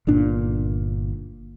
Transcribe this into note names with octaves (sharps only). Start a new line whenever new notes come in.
G1 A#2 D4